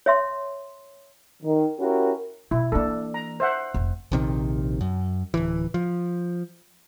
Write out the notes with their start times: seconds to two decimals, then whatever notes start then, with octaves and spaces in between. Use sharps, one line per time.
0.06 C#5 E5 C6
1.43 D#3
1.80 C#4 E4 F#4 G4 A#4
2.51 B2 E4
2.72 E3 A#3 D4 A4
3.14 A#5
3.40 C5 E5 F#5
3.74 F1
4.12 A#1 C3 D#3
4.81 F#2
5.34 D1 G1 E3
5.74 F3